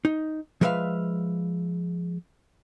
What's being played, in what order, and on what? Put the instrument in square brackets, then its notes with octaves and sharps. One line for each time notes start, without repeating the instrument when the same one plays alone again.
[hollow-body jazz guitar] D#4
F3 G#3 A#4 B4 E5 F5